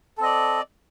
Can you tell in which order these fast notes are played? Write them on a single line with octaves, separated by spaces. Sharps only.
A4 C4 D#5 D5